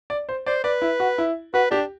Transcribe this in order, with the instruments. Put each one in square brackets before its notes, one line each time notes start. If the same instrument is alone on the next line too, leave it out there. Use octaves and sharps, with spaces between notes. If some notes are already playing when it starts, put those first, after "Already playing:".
[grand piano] D5
C5
[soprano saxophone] C5 [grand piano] D5
[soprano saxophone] B4 [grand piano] D5
[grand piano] E4
F#4
E4
[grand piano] F#4 [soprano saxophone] B4
[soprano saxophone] D4 [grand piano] G4